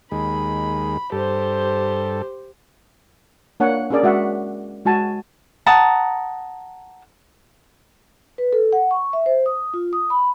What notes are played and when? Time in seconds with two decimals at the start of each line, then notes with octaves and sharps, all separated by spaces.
0.12 D#2 G#3 B5
1.12 G2 G4 A4 C5
3.60 A#3 D4 C#5 F#5
3.90 C#4 D4 G#4 A#4 D5
4.03 G#3 F#4 E5 F#5
4.85 G#3 F#4 G#5 A5
5.66 F#5 A5 A#5 D#6
8.38 B4
8.53 A4
8.73 F#5
8.91 C#6
9.13 E5
9.26 C5
9.46 D#6
9.74 F4
9.93 D#6
10.10 B5